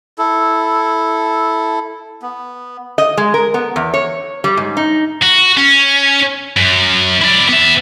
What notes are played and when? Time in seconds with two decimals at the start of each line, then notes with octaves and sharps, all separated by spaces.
0.18 E4 A4
2.22 B3
2.98 D#5
3.17 G#3
3.34 A#4
3.54 B3
3.76 E2
3.94 C#5
4.44 G3
4.57 G#2
4.77 D#4
5.23 F#4
5.57 C#4
6.57 F#2
7.21 E4 D5
7.49 B3 E5